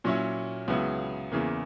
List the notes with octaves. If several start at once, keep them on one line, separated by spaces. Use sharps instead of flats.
A#2 F#3 C#4 E4
C#2 C#3 F#3 B3 E4
E2 C#3 E3 A#3